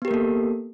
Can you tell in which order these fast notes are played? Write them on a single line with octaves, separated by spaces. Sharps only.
B3 G4 A#4 A#3 A4